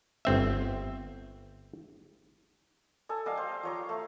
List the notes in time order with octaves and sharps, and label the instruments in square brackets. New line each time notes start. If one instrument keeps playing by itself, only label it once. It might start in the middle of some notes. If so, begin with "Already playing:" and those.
[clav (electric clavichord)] G1 C4 E5
[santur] A4 G#5 D#6
G3 G4 D#5 F5
C5
F3 C#5 A#5
A3